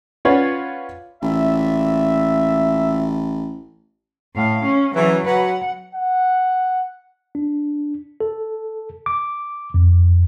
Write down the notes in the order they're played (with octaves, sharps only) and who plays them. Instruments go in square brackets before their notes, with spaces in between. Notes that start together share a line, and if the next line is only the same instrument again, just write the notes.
[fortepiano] C#4 F4 B4 C#5 D5 F#5
[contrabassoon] A1 [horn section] A#2 E5
[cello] A2 F5
C#4
[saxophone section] C#3 E3 [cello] F#3
[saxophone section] F#3 B4 [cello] F#5
[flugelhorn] F#5
[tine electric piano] D4
A4
D6
F2